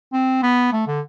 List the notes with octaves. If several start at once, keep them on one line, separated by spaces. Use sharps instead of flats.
C4
B3
A3
D3